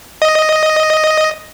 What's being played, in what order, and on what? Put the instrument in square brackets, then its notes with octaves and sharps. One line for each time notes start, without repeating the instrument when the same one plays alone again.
[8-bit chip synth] D#5